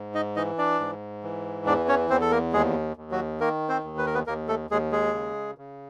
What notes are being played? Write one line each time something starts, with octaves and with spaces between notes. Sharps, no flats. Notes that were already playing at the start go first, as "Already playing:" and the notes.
Already playing: G#2
D#4 D#5
E3 D#4 D#5
D4 D5
G#2
E3
E2 D4 D5
C#4 C#5
E2 C4 C5
A4
A#3 A#4
D#2 G#3 G#4
D#2
F#3 F#4
D#3 A#3 A#4
C4 C5
D#2
B4
A#4
B3 B4
D#2 A#3 A#4
A3 A4
D#2 G#3 G#4
G#3 G#4
C#3
C#3